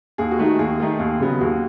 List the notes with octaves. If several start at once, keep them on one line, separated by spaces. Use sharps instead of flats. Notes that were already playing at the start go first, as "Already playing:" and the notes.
D#2 G#4
F#4
D#3 A3 D#4
F#4
D#2 G#4
D#3 A3 D#4
D#2
C#3 F#3 B3
D#2 F#4